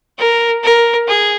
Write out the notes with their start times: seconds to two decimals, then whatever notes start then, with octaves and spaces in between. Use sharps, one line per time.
0.18 A#4
0.63 A#4
1.07 G#4